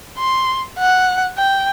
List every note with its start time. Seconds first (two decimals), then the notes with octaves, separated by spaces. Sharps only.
0.18 C6
0.79 F#5
1.38 G5